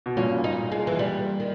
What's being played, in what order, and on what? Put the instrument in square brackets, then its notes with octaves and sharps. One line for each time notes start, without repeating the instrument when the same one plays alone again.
[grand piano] B2
[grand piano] G2 A#2 [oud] C#4
[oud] D#4
G#3
E3
G3
D#3